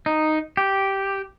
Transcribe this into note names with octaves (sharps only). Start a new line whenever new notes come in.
D#4
G4